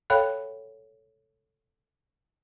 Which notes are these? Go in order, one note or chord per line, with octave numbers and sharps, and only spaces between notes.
A4 C#5 F5 G5 B5 F#6